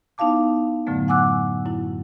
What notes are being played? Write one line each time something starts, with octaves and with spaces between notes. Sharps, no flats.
B3 D#4 E4 F5 A5 D6
F#2 A2 D3 F#3 A3 B3
F#5 G#5 D6 E6 F#6
F#2 E4